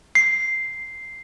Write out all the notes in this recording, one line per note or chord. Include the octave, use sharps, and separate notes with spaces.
C7